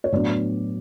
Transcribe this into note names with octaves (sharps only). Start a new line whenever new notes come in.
C#5
A2 F#3 B3 D4 D5